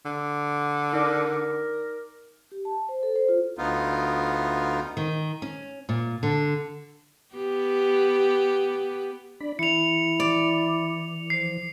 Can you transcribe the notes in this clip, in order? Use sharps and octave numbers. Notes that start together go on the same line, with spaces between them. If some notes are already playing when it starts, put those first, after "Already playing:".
D3
D#4 A#4 D5 D6
G4
A5
C5
A4
C5
F4
D2 B3 D#4 F4
D#3
C#4
A#2
D3
B3 G4
D4 D5 B5
E3 E4 C#7 F7
D5
F3 C7